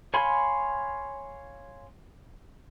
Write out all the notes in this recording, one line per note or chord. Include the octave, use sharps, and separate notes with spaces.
C#5 F5 G#5 B5 C6